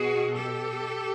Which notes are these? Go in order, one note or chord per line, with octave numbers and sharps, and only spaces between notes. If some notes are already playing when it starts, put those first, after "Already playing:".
Already playing: B2 F#4 G#4
G4 A4